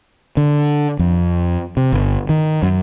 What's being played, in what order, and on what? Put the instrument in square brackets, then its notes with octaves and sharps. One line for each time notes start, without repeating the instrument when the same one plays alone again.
[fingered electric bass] D3
F2
C3
G1
D#3
F#2